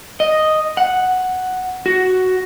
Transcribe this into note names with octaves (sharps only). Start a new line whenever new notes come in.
D#5
F#5
F#4